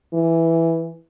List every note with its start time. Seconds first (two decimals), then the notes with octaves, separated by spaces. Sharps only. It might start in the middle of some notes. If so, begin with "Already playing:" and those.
0.14 E3